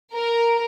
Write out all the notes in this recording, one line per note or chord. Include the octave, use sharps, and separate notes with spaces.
A#4